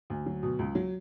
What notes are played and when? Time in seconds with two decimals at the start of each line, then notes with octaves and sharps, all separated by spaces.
0.10 D2
0.26 F#3
0.43 B2
0.59 C#2
0.75 F#3